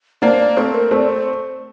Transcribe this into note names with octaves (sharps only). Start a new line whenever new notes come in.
A#3 D4 C5
D5
A3 C4 C5
A#4
A3 C4 D5
C5